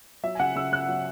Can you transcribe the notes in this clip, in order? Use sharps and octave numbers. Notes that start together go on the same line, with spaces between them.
F#3 E5
G#5
C#3 F#5
C#3 E6
C#3 F#6
F#3